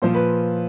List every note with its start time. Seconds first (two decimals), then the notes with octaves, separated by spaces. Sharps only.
0.02 A#2 F3 C5
0.15 B4